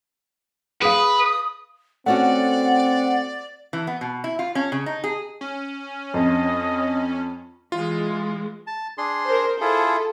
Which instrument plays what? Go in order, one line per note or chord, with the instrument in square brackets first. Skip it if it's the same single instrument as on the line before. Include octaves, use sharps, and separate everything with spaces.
[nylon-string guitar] G#4 F5 [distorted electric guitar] B4 [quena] D#6
[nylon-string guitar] A3 C#4 F#4 [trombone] C4 [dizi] D5 [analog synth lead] F#5
[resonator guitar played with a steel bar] E3
B3
B2
E4
F4
C#4
C#3
D#4
G#4
[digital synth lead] C#4
[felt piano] F2 [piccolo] D#5
[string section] E3 G#3 [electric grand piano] F4
[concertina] A5
D4 G#4 C6
[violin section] A#4 C5
[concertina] E4 F4 G#4 [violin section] A4